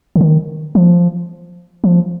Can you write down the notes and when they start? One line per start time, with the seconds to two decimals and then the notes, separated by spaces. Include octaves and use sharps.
0.16 D3
0.21 D#3
0.75 F3
1.84 F3